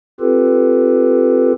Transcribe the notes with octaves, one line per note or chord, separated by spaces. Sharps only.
C4 F4 G4 A4 B4